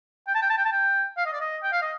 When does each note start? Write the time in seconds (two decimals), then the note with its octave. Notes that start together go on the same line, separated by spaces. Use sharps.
0.27 G5
0.35 A5
0.42 G5
0.50 A5
0.57 G5
0.65 A5
0.72 G5
1.17 F5
1.26 D#5
1.33 D5
1.41 D#5
1.63 G5
1.72 F5
1.82 D#5